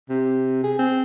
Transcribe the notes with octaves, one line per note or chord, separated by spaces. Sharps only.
C3
G#4
C4